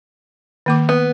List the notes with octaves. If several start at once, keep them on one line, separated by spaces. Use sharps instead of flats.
D#3 A#3 D6
B3